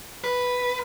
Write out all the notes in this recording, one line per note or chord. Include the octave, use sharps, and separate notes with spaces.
B4